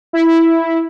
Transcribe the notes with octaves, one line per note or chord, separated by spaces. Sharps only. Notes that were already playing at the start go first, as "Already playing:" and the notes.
E4